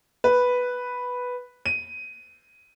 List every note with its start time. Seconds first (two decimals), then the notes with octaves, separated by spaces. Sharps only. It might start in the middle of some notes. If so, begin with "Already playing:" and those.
0.24 B4
1.66 D#7